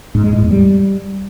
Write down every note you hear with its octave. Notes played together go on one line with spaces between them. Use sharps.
G#2
G#3
A2
E2
G3